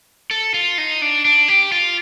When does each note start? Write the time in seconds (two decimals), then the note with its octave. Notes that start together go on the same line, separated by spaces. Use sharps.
0.31 A4
0.54 F4
0.78 D#4
1.02 D4
1.25 D4
1.48 G4
1.72 F4